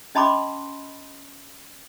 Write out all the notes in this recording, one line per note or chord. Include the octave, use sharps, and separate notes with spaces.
C#4 D#5 A5 B5 C6 D6